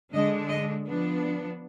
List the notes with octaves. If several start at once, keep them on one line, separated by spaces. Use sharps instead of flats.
D3 G#3 D4 D#5
D#5
F3 B3 D4